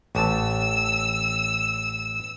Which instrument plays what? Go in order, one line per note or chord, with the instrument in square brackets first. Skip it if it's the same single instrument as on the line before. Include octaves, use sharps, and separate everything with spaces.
[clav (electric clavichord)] A1 A5 [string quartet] E6